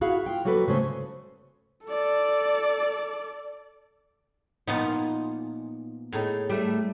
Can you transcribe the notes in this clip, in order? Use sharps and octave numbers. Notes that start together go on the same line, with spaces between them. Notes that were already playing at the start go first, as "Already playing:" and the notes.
E4 F#4 G#4 E5 F5
F4 G5
F#3 A#3 F#4 A4 B4
C#3 A3 C#4 C5
A4 D5
A#2 F3 B3 D#4
A2 D#4 G#4 A4 C#5
G3 A3